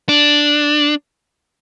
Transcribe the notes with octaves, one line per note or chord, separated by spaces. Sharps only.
D4